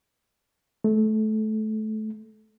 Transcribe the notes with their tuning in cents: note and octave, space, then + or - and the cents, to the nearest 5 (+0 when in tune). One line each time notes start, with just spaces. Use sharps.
A3 -20